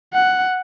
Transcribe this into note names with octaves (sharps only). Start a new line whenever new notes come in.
F#5